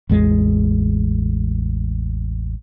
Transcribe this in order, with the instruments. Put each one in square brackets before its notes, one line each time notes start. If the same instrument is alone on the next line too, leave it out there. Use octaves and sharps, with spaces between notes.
[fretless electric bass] A1 E2 G#3